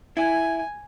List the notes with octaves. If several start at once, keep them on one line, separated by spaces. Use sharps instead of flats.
E4 G#5